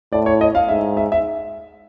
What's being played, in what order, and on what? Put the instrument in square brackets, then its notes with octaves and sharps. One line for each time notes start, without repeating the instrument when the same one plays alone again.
[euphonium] A2 [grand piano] D5
[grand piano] C#5
D#5
F5
[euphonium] G#2 [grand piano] E5
[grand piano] E5
E5